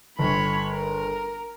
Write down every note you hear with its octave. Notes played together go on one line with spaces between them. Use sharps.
G1 C#5 B5
A#4